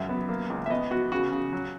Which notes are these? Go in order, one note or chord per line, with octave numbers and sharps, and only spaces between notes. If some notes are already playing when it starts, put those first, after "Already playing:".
Already playing: C#2 F#2 E5
B3
A#3
C#2
E5
B3 D#5
B3 F#4
C#3 F#4
C#3
F#3